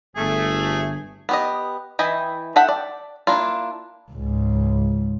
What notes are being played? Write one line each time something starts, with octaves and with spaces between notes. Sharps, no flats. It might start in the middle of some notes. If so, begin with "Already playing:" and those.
G1 A3 G#4
B3 G4 D#5
E3 E4 D#5 G5
A4 E5 F#5 G5
D5
A#3 D4 E4 F4
C#2 G#2